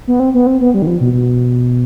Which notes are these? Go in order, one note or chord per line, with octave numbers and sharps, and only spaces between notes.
B3
C4
B3
C4
B3
G3
D#3
F3
B2
B2